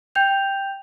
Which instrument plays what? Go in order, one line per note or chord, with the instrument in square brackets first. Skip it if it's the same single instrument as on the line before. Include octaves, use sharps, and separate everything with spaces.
[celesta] G5 G6 F7